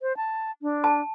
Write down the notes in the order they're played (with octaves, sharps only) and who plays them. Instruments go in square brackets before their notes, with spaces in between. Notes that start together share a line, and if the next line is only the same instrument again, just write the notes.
[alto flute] C5
A5
D4
[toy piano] A5